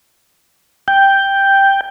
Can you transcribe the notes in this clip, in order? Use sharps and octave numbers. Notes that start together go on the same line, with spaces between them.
G5